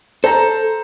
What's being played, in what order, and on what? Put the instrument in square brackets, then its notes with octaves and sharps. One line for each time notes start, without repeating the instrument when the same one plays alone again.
[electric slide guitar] A4 [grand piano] C5 A#5